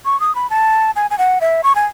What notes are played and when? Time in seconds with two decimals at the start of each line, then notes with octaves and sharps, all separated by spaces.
0.05 C#6
0.20 D#6
0.35 B5
0.50 A5
0.96 G#5
1.11 G#5
1.18 F#5
1.41 E5
1.64 C#6
1.75 G#5